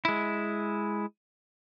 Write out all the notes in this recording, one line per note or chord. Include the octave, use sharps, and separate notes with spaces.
G#3 E4